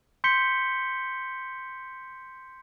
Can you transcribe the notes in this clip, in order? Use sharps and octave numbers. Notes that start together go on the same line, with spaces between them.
C6 G6 B6 C#7 G7